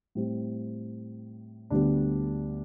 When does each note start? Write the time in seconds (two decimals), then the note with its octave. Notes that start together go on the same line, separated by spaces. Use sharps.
0.15 A2 G3 C4
1.70 D2 D3 G3 B3 D4